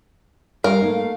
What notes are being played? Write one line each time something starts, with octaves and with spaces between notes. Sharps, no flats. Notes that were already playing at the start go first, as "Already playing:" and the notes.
G3 A#4 F5
A3 A#3 D#4